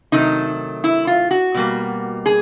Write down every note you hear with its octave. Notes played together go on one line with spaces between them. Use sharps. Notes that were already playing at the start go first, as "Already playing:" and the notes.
C3 D#3 F#3 A3 D#4
E4
F4
F#4
B2 G3 A#3
G#4